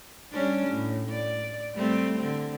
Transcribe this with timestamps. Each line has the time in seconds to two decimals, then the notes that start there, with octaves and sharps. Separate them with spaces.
0.32 G3 C#4 D4
0.68 A2
1.09 D5
1.74 G3 A3 C4
2.18 D3 C4